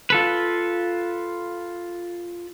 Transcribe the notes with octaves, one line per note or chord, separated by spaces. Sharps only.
F4 A4 B4